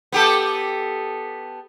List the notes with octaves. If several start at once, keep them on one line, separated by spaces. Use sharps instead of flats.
B3 G4 A4